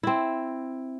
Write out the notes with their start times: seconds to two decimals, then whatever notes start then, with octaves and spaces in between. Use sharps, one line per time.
0.03 C4 E4